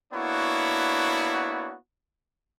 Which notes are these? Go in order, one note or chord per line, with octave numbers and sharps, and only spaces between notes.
A#3 B3 D4 E4 F#4 C#5